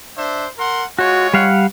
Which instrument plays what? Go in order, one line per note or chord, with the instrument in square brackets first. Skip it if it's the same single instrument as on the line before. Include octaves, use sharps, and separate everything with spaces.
[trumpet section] D4 C5 E5
A#4 F#5 C6
[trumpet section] G#3 F4 C#5 [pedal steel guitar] F#4
[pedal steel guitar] G3 F5 F#5